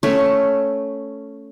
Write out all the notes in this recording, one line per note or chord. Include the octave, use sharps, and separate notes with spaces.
A3 C#4 A4 C#5